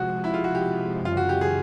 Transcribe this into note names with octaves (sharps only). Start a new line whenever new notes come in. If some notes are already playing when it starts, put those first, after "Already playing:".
Already playing: C3 F3 G#3 F#4
E4
F4
F#4
G4
F#2 C#3 E3
F4
F#4
G4
G#4